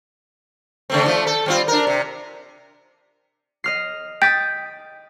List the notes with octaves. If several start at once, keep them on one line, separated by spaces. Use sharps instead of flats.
C#3 A3 C4
F3 A3
A4
G3 C4 F4
D4 A#4
C3
D#5 F6 C7
G5 D#6 G6 A6 B6